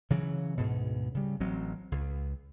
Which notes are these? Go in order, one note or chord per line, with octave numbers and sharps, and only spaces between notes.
C#3 E3 F#3
D2 G#2 B2
C#3 G3
A1 F#3 C4
C#2